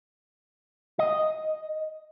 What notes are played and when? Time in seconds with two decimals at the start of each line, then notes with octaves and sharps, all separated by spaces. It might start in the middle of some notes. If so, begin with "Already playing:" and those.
0.99 D#5